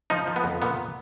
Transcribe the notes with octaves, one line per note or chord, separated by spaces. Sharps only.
F3 D#4
F3
B3
F2
A#2 B3